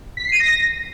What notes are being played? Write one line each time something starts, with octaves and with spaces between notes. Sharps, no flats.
B6
C7
D#7
A#6